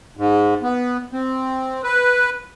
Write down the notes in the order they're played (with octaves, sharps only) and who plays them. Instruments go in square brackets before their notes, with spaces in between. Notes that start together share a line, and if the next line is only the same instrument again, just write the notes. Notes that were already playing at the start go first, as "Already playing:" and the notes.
[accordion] G#2
B3
C4
B4